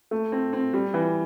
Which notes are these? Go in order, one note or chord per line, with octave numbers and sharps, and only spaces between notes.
A3
C4
C4
G3
E3